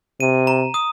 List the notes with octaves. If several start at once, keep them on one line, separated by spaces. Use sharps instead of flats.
C3 D#7
A#5
D#6